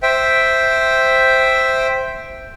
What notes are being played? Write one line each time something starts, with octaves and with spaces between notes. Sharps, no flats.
C5 E5 G5